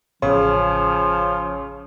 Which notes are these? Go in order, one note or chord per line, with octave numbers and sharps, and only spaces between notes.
A1 C#3 F3 C#4 C#5